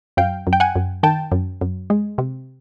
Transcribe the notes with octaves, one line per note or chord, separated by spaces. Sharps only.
F#2 F5 G5
F#2
G5
F#5 G#5
F#2
D#3 G5 A5
F#2
F#2
G#3
C3